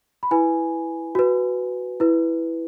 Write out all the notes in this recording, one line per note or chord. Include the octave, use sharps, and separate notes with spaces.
B5
E4 B4 G#5
F#4 B4
E4 B4